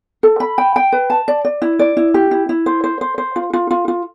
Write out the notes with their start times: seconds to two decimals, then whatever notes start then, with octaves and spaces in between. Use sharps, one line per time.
0.23 A4
0.40 B5
0.58 G5
0.76 G5
0.92 B4
1.10 A5
1.28 D5
1.45 D5
1.62 E4
1.79 D5
1.97 E4
2.14 G4
2.31 E4
2.49 E4
2.66 C5
2.84 C5
3.01 C5
3.18 C5
3.36 F4
3.53 F4
3.71 F4
3.88 F4